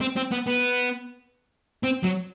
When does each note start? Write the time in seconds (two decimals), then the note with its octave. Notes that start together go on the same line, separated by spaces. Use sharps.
0.01 C4
0.16 C4
0.31 B3
0.47 B3
1.84 C4
2.04 F#3